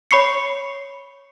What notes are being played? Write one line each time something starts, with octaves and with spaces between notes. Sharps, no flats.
C#5 B5 C#6 C7 C#7